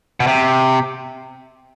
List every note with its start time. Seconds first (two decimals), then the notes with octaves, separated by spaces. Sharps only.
0.20 B2
0.27 C3